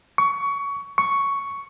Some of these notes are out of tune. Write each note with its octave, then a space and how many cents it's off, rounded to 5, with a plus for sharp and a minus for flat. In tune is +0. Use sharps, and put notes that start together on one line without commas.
C#6 +20
C#6 +5